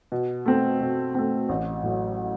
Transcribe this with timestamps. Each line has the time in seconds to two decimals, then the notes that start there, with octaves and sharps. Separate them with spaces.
0.12 B2
0.46 A3 C4
0.80 B2
1.15 A3 C4
1.49 A1
1.83 A2 F#3